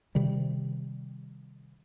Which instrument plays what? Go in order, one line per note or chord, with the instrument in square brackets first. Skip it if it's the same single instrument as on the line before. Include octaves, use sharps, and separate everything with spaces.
[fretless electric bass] C3 D#3 G3